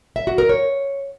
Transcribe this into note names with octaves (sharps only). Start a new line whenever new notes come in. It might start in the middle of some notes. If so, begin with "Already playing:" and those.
E5
F#4
A#4
C#5